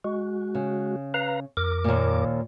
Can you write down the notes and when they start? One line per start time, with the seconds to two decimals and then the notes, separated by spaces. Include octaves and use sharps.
0.04 G#3 F#4
0.55 C#3
1.14 B4 F5 A#5
1.57 F2 A#4 D6
1.84 D#2 A#2